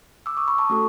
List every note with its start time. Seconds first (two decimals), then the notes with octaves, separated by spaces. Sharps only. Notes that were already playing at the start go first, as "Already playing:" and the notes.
0.26 D6 E6
0.37 C#6 D#6
0.48 B5 C#6
0.58 A5 B5
0.70 A3 C#4 F#4 A4